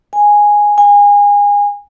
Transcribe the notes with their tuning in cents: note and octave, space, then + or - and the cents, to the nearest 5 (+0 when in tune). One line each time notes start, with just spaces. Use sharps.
G#5 -5
G#5 -25